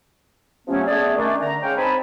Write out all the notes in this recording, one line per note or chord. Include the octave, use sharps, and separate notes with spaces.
C3 F3 F#3 A3 B3 C#4
A3 B3 G#4 D5
D#3 A3 C#4 D4
D3 A#5
G#3 C#4 C#5 F5 G5
C4 D#4 G#5 A5 B5